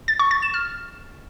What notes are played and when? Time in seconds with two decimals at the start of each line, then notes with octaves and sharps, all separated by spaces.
0.08 A6
0.19 C#6
0.31 A6
0.42 E7
0.54 F6